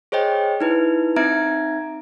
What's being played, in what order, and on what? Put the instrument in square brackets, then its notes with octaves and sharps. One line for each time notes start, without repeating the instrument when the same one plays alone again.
[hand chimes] G#4 C5 C#5 D#5 G5
D#4 E4 B4
C4 D#4 E5 A#5 G#6 D7